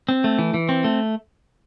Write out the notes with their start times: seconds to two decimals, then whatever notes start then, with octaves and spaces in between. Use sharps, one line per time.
0.09 C4
0.24 A3
0.39 E3
0.54 E3
0.69 C4
0.84 A3